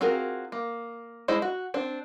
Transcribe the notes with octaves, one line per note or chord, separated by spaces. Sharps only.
C4 F4 F#4 G#4 A#4
A#3
G#3 E4 A4 C5 D#5
F#4
C4 D4